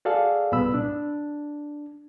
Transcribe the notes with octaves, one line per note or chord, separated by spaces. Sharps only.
F#4 G#4 A4 D5 F5
C2 G2 A#2 B3 B5 E6
D4